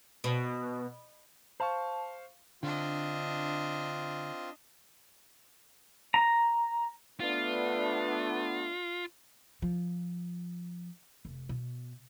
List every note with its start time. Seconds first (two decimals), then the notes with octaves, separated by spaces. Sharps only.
0.24 B2
1.60 C5 F5 A5 C#6
2.63 D3 C4 D4 F4 D#5
6.14 A#5
7.20 A3 B3 D4 F4
9.62 F3
11.25 F1
11.49 B2